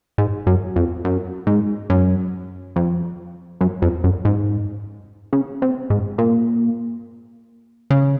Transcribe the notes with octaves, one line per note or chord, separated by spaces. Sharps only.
G#2
F#2
F2
F#2
G#2
F#2
F2
F#2
F2
F#2
G#2
C#3
C3
G#2
A#2
C#3